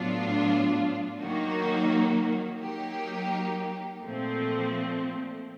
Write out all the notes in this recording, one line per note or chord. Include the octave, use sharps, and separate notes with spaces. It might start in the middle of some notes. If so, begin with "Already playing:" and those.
Already playing: A2 F#3 B3 D4 F4
D#3 F#3 A#3 D#4 F#4
F#3 A#3 D#4 G4
A#2 F3 A3 C4